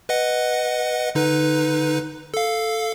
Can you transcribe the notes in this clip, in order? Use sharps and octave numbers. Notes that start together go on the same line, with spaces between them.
B4 D#5 F#5
D3 D#4 B4
A4 F5